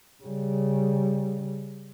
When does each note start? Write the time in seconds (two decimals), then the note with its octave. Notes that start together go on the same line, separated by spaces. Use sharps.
0.24 C#3 G3